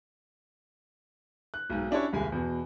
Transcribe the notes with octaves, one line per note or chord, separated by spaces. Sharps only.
F#6
B1 G#2
C#4 D4 E4 G4 C#5
D#1 C2 G#3 G#5
E2 B2